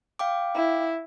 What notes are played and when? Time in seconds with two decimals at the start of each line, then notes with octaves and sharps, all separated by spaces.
0.19 F5 G5 D6
0.54 E4